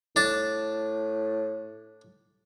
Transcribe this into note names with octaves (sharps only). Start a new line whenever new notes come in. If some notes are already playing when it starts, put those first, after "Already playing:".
A2 D4 A5